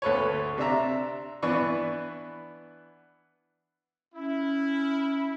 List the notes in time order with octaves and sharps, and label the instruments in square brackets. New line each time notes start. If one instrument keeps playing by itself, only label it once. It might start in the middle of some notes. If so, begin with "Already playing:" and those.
[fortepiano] D2 A4 B4 C#5
C3 D4 E5 A#5
E3 B3 D4 B4 C#6
[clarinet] C#4 [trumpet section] E4